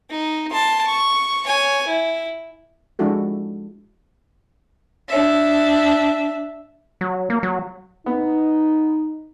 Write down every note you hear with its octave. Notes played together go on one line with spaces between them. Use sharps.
D#4
A5 C6
C#6
C#5 G#5
E4
F3 G#3 D4 E4 F#4 A4
D4 E5
F#3
A#3
F#3
B3 D#4